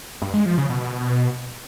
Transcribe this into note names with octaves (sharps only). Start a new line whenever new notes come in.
G2
G#3
F3
C#3
B2